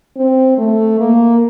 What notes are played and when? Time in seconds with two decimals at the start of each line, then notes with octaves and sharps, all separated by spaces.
0.17 C4
0.58 A3
1.00 A#3